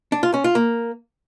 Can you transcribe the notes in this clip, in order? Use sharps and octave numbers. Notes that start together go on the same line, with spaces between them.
D4
F4
C#4
F4
A#3